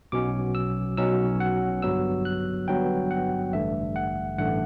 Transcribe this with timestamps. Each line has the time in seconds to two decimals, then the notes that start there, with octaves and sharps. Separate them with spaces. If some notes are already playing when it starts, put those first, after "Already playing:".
0.12 B1 B2 F#3 C#4 D6
0.55 E6
0.97 B1 B2 F#3 C#4 E6
1.40 F#5
1.82 G1 G2 F#3 B3 E6
2.25 F#6
2.68 G1 G2 F#3 B3 G5
3.11 F#5
3.53 A1 G2 D3 A3 E5
3.96 F#5
4.39 A1 G2 D3 A3 F#5